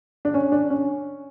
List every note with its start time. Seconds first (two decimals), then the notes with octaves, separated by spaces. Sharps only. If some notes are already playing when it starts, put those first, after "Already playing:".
0.25 D4
0.34 C#4
0.52 D4
0.70 C#4